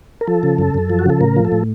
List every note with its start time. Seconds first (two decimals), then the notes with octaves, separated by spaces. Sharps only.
0.21 A#4
0.27 F3 A4
0.43 C#3
0.59 F#2
0.74 F#2
0.90 F3
0.99 F#4
1.06 C#3 A4
1.21 A2 A#4
1.36 F3
1.45 A4
1.52 A2